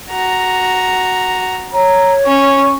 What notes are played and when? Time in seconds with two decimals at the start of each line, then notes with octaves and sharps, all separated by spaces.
0.10 F#4 A#5
1.73 C#5 A#5
2.26 C#4 C#6